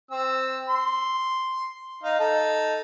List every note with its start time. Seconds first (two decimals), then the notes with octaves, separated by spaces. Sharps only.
0.11 C4 E6
0.69 C6
2.03 D#4 F5
2.19 D#4 A4